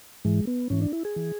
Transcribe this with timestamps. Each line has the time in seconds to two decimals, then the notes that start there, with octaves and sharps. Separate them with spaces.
0.25 G#2 E3 G#3
0.47 B3
0.70 G#2 E3 C#4
0.82 D4
0.93 E4
1.05 G#4
1.16 E3